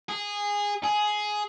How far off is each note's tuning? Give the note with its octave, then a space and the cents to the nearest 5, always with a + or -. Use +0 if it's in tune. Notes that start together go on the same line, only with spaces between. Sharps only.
G#4 -15
G#4 +10